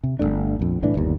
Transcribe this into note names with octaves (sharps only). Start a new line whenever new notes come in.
C3
G1 F2 A3 D4
A#1 F2
C2 A2 E3 D4
G1 D#2